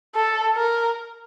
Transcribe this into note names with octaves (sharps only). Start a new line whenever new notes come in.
A4
A#4